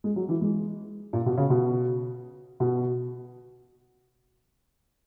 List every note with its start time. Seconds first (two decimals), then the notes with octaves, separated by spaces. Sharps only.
0.04 G#3
0.16 F#3
0.29 E3
0.41 G#3
1.13 A#2
1.26 B2
1.37 C#3
1.50 B2
2.60 B2